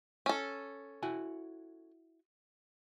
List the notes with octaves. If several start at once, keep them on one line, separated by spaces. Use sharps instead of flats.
C#4 A4
E4 F#4 G#5